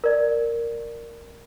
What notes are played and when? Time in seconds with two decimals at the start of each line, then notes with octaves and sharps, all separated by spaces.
0.04 A#4 D5